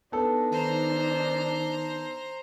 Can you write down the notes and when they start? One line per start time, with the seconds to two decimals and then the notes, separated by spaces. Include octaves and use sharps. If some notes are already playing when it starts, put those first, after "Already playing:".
0.12 B3 D4 D#4 A4
0.52 D#3 C5 A#5